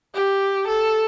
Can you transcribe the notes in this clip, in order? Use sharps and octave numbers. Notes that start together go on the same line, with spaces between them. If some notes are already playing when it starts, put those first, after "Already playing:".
G4
A4